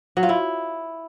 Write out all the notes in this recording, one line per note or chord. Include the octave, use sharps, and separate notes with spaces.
F#3
F4
E4